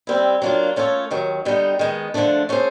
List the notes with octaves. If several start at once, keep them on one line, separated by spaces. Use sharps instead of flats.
G3 C4 E4
F#3 A#3 D4 F4
A3 C#4 F4 A4 C#5
D#2 D#3 F#3
D3 G3 B3 D#4
D#3 G#3 B3
D3 F3 A3 D4
A3 C#4 F4 G#4 C5